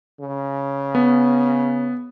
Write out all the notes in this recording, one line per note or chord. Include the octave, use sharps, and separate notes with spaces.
C#3
B3